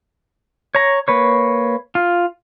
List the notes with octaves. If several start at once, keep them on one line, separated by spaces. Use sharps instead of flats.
C#5 A#5
A#3 B4 C#5
F4